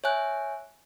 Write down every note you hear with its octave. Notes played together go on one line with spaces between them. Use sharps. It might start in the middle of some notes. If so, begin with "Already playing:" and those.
C#5 E5 G#5 F#6